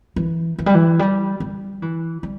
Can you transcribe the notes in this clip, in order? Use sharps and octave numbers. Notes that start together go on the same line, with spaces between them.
E3
E3
G3
E3
G3
G3
E3
G3